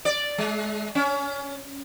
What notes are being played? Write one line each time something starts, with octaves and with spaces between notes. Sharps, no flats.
D5
G#3
C#4